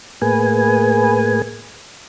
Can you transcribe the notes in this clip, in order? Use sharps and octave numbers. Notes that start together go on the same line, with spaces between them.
A2 A#3 G#4 B4 G#5